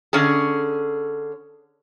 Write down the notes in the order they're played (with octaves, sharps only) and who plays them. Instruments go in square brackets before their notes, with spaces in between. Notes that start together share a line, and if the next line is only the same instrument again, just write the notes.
[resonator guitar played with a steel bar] D3 C#4 G#4